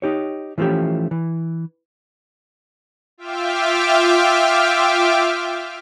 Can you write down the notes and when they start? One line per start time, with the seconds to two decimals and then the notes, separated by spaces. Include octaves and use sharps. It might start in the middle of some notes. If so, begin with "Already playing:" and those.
0.02 D#4 G4 C#5
0.58 E3 F3 A3 C#4 G4
1.11 E3
3.18 F4 E5 G5 D6 F6